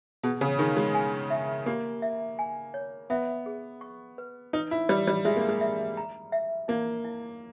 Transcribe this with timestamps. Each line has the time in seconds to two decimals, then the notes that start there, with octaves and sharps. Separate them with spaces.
0.23 B2 G#4
0.41 C#3
0.59 D#3 G#4
0.77 G#3
0.95 G#5
1.30 E5
1.66 A#3 G4
2.02 E5
2.39 G#5
2.74 C#5
3.10 B3 E5
3.46 G#4
3.81 C#6
4.18 B4
4.53 D#4 B4
4.71 E4
4.89 G3 B4
5.07 G3
5.25 G#3 E5
5.36 A#3
5.48 G#3
5.61 E5
5.97 A#5
6.32 E5
6.68 A#3 E4
7.04 E4